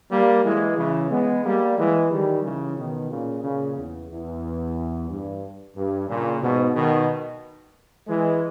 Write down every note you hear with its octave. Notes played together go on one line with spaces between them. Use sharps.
G3 A#3
E3 G#3
C#3 E3
G#3 B3
G3 A#3
E3 G#3
D#3 G3
C#3 E3
B2 D#3
A#2 C#3
A#2 C#3
E2
E2
G2
G2
A#2 C#3
G#2 B2
B2 D#3
E3 G#3